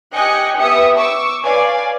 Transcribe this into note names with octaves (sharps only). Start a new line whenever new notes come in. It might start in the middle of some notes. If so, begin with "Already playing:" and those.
G4 D#5 G5 G#5 F#6 C#7
B3 G4 E5 D#6 C#7
C#6 D6 E6
B4 C#5 D5 F5 G#5